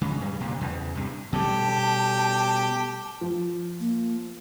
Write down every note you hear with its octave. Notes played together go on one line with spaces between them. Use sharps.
C#3 G#3
G2 G3 G#3
C2 A#2 D3
E2 C#3 E3
G2 C3
B2 G3 A3 G4 A5
F3
A#3